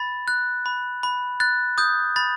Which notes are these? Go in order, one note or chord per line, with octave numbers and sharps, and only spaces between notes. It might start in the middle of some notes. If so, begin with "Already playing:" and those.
Already playing: B5 A6
F#6
B5
B5
F#6 A6
D#6 G6
B5 A6